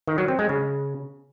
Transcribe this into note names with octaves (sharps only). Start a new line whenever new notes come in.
D#3
F#3
C4
G#3
C#3